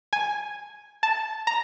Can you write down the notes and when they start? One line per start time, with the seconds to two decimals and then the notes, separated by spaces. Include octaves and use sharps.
0.13 G#5
1.03 A5
1.47 A#5